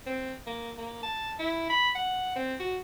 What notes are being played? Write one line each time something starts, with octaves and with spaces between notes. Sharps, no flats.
C4
A#3
A#3
A5
E4
B5
F#5
C4
F#4